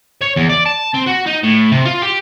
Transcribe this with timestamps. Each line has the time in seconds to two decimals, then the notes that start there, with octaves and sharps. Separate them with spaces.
0.22 C#5
0.36 E2
0.49 D5
0.65 A5
0.94 C4
1.06 F#4
1.26 D#4
1.43 A2
1.72 C3
1.85 F4
2.02 G4